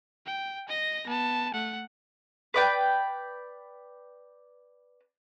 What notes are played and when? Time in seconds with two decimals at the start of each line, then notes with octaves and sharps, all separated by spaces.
0.26 G5
0.69 D#5 A#6
1.07 B3 A5
1.53 A3 F#5
2.54 B4 D5 G5